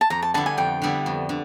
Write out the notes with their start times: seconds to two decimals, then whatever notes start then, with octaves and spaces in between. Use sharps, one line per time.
0.01 A5
0.10 F2 A#5
0.22 A5
0.34 D3 G3 B3 E4 A5
0.46 G#5
0.57 F2 G5
0.82 D3 G3 B3 E4
1.06 F2
1.29 D3